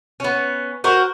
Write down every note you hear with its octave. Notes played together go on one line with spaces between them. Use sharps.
B3 C#4
F#4 A#4 C5